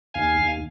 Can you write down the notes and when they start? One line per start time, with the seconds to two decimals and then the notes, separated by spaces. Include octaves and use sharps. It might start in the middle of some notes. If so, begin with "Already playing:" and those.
0.14 D#2 F5 G#5
0.39 D#2